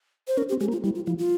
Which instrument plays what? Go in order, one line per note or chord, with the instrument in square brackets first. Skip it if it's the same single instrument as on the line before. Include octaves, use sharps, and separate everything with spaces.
[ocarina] C5
[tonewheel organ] C#4 [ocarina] A#4
[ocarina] G4
[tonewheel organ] C4
[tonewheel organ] G#3 [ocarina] G4
[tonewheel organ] A#3
[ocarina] F4
[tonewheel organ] G3 [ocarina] E4
[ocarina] F4
[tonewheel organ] F3 [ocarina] E4
[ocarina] F4